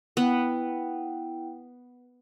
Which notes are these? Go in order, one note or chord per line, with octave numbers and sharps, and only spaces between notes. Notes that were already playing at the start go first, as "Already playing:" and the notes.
B3 E4 F#5 G5